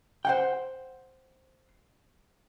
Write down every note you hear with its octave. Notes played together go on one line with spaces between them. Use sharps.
C5 F#5 G5